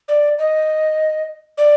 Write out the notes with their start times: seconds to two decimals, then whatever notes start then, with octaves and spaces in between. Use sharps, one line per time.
0.09 D5
0.39 D#5
1.58 D5